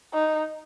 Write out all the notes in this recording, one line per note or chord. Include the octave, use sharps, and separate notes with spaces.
D#4